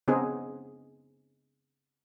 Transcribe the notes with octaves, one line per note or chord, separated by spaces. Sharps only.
C#3 B3 C4 D#4 G#4